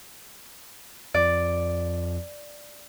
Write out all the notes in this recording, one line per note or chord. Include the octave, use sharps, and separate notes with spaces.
F2 D5